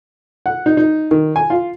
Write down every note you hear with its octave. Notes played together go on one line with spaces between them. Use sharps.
F#5
D#4
D#4
D#3
G#5
F4